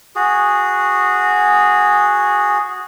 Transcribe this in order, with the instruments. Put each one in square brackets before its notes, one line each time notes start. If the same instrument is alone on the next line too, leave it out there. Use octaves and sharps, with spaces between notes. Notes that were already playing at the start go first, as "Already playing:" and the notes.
[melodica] F#4 G#4